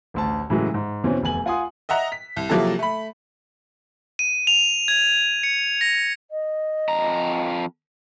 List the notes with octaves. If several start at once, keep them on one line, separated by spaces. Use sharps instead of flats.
A1 D2 A5
A2 C#3 E3 F#3 G#3
G#2
E2 B2 E3 C4 C#4
F1 E2 G#5 F#7
F4 F#5 G#5 C6 D#6
D#5 E5 F#5 A#5
B6
C2
C3 F3 F#3 A#3 E4 A4
A3 B5
D#7
F7
G#6
C#7
A#6
D#5
F2 A#5